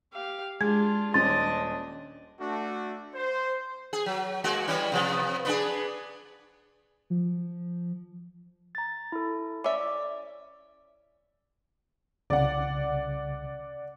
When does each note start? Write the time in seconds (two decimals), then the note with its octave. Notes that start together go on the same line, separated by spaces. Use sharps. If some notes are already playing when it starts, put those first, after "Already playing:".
0.13 G4 F5
0.61 G#3 D4 F4 G#4 G#6
1.14 D#1 C#4 D4 D#5 C6 A6
2.40 A3 D4 F#4
3.14 C5
3.93 G#4
4.06 F#3
4.44 G#3 A#3 F#4
4.68 E3 G3 C#4
4.92 C3 F3 B3
5.45 B3 D4 G#4
7.10 F3
8.75 A#5 A6
9.12 E4 A4
9.64 C#4 D5 E5 D6
12.30 C2 C#3 D5 F#5